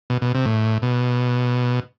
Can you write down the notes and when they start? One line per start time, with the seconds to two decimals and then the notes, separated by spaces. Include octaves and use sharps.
0.10 B2
0.22 B2
0.35 C3
0.45 A2
0.82 B2